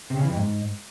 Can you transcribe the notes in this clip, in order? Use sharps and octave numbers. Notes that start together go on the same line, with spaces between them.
C3
C#3
E3
F2
G#2